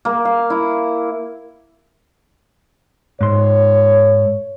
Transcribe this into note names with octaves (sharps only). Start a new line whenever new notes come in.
A#3
F5
E4
G#2 C#5 C6